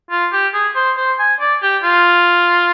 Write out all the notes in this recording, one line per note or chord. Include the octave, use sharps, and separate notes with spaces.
F4
G4
G#4
C5
C5
G#5
D5
G4
F4